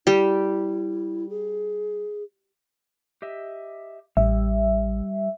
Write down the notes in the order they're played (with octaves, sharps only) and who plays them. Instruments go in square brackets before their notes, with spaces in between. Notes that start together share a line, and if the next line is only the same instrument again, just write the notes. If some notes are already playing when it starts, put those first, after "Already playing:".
[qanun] G3 G4 [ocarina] E4
[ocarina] G#4
[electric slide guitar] G4 D#5 E5
[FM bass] A1 [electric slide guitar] G3 [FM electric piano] E5